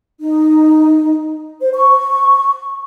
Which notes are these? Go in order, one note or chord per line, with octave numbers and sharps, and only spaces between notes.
D#4
C5
C#6